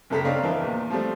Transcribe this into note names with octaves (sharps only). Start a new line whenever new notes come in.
F#1 C#2 A4 A#5 B6
C4 D4 C#5 D#5 F5 A#5
E3 F3 A#4 E5
E2 A#2
F3 G3 A3 C4